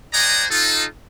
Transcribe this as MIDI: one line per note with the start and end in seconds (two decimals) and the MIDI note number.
0.14 0.46 72
0.14 0.46 74
0.14 0.46 75
0.14 0.46 78
0.14 0.46 80
0.14 0.46 82
0.51 0.85 63
0.51 0.85 65
0.51 0.85 69